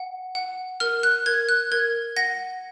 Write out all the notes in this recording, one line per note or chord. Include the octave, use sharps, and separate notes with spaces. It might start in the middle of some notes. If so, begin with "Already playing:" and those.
Already playing: F#5
F#5
A#4 F6
F#6
A#4 G#6
F#6
A#4 G#6
F#5 A#6